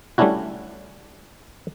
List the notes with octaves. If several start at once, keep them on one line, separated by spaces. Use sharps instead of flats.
G3 A3 C#4 D4 E4 F#4